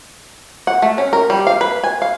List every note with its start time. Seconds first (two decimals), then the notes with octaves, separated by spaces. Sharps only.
0.67 F#5
0.82 A3
0.98 C#4
1.13 A#4
1.30 G3
1.47 F5
1.61 B4
1.84 G#5
2.02 F5